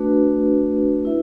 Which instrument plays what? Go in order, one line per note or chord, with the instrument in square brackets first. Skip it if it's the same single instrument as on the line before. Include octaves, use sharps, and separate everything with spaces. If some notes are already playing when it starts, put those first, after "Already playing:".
Already playing: [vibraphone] A3 D4 F#4 B4
E4 B4 E5